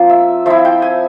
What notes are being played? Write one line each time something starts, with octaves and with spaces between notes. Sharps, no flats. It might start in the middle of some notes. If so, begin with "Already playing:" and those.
Already playing: F3 A#3 C4 F4
E5
F3 C4 E4 E5
G5
G#5